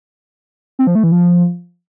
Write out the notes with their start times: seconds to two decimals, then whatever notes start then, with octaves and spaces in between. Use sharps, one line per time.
0.79 C4
0.87 F3
0.95 A3
1.04 E3
1.12 F3